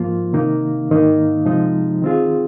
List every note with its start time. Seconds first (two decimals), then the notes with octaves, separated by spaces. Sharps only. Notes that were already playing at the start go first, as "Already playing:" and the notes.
Already playing: G#2 F3 A#3 F4
0.33 C3 D#3 A#3 D#4
0.90 G#2 D#3 A#3 D#4
1.46 C3 F3 G#3 D#4
2.02 D#3 C4 F4 G#4